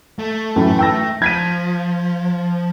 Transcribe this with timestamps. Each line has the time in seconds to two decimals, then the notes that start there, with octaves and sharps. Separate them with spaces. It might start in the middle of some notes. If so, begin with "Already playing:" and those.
0.19 A3
0.56 F#2 A2 E3
0.79 G5 E6 A#6
1.22 F3 G#6 B6 D#7